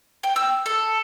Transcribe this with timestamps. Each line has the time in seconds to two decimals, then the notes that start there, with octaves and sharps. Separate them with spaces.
0.23 G5
0.36 E6
0.66 A4